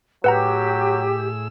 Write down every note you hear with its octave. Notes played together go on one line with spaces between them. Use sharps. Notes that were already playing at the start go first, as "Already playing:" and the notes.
A2 F#3 G4 G#4 B4 F#5 A#5 E6